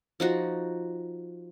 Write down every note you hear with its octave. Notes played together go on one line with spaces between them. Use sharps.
F3 D#4 F#4